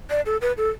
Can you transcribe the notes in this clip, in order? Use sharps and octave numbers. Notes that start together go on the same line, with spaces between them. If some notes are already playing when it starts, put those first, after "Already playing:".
D5
A4
B4
A4